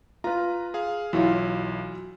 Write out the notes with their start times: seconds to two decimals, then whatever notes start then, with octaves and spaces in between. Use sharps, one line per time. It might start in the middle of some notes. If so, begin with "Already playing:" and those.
0.24 F4 B4 A#5
0.74 G#4 F5
1.13 B1 E3 F#3 E4 F4